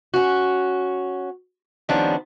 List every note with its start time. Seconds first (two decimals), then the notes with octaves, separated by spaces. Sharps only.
0.14 C#4 F#4
1.89 D#3 F3 G3 B3 C#4 D4